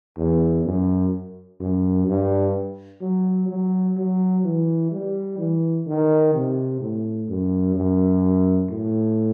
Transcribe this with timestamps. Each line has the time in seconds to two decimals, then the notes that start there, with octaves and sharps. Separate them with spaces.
0.17 E2
0.65 F#2
1.60 F#2
2.07 G2
3.01 F#3
3.48 F#3
3.97 F#3
4.44 E3
4.92 G3
5.38 E3
5.87 D#3
6.34 C3
6.81 A2
7.29 F#2
7.76 F#2
8.70 A2